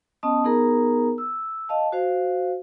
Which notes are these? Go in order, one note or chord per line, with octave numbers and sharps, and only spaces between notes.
B3 C#4 D#5 A5 D#6
B3 D#4 G#4 A#4 A#5
E6
D#5 F5 A5
F#4 C5 F5